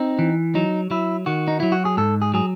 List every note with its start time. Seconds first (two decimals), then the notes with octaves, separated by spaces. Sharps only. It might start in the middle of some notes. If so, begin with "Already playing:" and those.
Already playing: C4 D#4
0.19 E3
0.55 F#3 D#4
0.91 F#3 E4
1.26 D#3 F#4
1.48 D#4
1.60 F#3 E4
1.72 F#4
1.85 G#4
1.97 G#2 A4
2.22 G#4
2.34 F#3 G#4